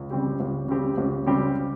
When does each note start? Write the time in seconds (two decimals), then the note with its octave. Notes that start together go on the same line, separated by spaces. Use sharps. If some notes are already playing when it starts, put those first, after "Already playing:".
Already playing: C#2
0.10 C#3 G3 C4 G4
0.40 C#2
0.68 C#3 G3 C4 G4
0.98 C#2
1.26 C#3 G3 C4 G4